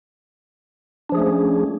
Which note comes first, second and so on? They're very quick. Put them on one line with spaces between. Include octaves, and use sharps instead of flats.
D4 F3 G#4 A3 C#4